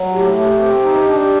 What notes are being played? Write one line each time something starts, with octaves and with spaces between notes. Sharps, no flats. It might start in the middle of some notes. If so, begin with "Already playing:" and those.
Already playing: F#3
A2 G4
A3
C4
D#4
D4